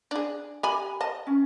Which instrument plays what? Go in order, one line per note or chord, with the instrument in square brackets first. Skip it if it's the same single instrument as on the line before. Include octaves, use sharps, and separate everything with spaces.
[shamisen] D4 G#4
G4 G#5 B5
D#5 A5
[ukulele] C#4